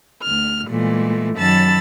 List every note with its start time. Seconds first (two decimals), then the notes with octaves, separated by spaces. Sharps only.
0.23 D2 F6
0.69 A#2 E3 G#3 A3
1.37 F#2 D#3 A5 B5 E6 A6